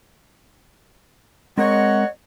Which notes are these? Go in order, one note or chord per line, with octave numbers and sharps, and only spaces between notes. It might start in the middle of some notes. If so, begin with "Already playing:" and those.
G#3 C4 A#4 C#5 D#5 F#5